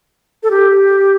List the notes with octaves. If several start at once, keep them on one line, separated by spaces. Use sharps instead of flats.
A4
G4